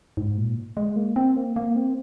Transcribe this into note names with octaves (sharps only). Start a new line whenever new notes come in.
G#2
A#2
G#3
A#3
C4
A#3
A#3
C4